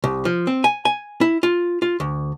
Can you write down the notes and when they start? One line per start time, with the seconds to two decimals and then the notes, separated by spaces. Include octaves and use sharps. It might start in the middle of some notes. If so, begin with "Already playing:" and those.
0.04 C2
0.25 F3
0.47 C4
0.64 G#5
0.85 G#5
1.21 E4
1.43 F4
1.82 F4
2.00 D2